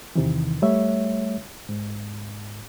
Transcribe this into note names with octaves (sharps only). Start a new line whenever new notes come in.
E2 C3 D#3 E3
G3 A3 C#5 E5
G#2